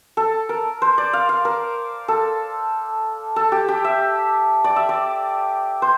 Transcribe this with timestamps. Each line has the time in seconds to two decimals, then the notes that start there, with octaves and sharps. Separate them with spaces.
0.17 A4
0.49 A#4
0.82 C5
0.98 D5
1.13 F5
1.29 F5
1.45 A#4
2.08 A4
3.36 A4
3.52 G4
3.68 G4
3.84 E5
4.64 D5
4.76 E5
4.89 D5
5.82 C5